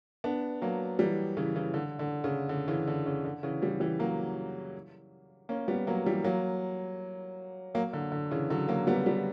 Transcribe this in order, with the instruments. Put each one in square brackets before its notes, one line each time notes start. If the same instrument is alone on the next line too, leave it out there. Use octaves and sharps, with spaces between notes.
[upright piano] B3 D4
F#3 A#3
E3 G3
C#3 E3
C#3 E3
D3
D3
C#3
D3
C#3 E3
D3
C#3
D3
C#3 E3
E3 G3
E3 G3
F#3 A#3
A#3 C#4
G3 B3
F#3 A#3
E3 G3
F#3 A#3
F#3 A#3
D3
D3
C#3 E3
D3 F#3
F#3 A#3
G3 B3
G3 B3